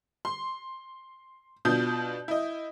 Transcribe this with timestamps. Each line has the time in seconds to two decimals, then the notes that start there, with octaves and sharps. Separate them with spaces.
0.25 C6
1.65 B2 D4 F4 D#6 G6
2.28 E4 D#5